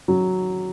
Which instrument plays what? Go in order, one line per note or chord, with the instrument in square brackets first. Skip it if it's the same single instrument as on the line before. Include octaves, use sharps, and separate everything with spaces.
[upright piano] F#3